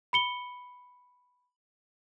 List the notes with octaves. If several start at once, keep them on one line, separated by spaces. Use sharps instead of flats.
B5 C#7 G7